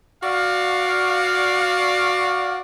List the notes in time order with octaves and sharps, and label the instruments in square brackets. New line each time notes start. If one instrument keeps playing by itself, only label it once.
[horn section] F#4 D5 F5